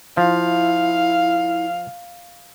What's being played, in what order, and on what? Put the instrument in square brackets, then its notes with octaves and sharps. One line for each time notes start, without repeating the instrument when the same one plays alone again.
[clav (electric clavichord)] F3 [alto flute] E4 [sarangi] F5